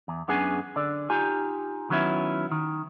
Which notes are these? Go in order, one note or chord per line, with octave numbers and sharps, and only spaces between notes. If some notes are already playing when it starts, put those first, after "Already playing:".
E2
F#2 B3 C#4 D4 G#4 G#5
D3 D5
D#4 F4 G4 G#5
D#3 F#3 B3 C#4 E4
D#3